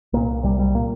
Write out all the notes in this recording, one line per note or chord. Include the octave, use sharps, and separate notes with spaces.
C2 A#2 A#3
C2 C3 G3
G3
A#2 A#3